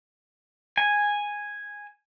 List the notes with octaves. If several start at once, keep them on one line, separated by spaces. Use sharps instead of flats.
G#5